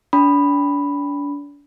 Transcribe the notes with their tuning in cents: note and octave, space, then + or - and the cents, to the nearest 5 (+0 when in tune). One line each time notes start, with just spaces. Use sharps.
D4 -35 B5 +0